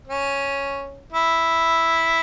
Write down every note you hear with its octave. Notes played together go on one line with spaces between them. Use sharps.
C#4
E4